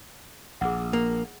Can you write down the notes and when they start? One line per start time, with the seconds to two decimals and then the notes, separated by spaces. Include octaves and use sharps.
0.61 A#1 G#4 F#5
0.93 A#3